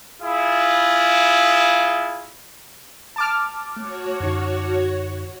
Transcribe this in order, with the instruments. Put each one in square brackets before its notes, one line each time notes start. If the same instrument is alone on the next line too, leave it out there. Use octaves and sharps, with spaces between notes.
[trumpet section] E4 F4 G#4
[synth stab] A5 D6 F6
[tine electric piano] A3 [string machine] F#4 C#5
[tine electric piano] F#2 D3 D#4